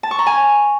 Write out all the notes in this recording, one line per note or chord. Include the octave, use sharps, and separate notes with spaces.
A5
C#6
A#5
G#5